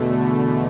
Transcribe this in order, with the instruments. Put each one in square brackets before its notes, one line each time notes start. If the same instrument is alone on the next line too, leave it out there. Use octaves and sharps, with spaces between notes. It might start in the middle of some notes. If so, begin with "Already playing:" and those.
Already playing: [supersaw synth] E2 D3 A3 [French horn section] B2